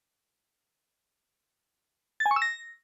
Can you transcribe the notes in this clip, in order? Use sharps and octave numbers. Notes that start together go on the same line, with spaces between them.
A6
G#5
C#6
E6
A#6